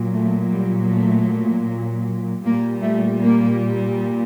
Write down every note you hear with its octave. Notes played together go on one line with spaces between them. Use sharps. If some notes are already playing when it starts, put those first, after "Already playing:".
Already playing: A#2 F#3
A3
G3
A3
A#2 G3 A#3
A3
A#3